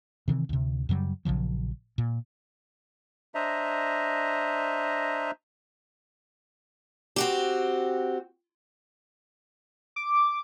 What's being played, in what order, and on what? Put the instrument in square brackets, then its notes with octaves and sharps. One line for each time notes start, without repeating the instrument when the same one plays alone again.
[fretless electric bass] C3 D#3 E3 C4
D2 C3
F#2 C#3 F#3 G3
A#1 C#3 F3 F#3
A#2
[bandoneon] D4 C5 D#5 E5 A#5
[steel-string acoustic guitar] C4 F#4 G4
[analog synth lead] D6